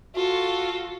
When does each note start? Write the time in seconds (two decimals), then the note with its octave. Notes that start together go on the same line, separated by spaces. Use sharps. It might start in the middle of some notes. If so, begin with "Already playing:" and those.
0.15 F4 F#4 A4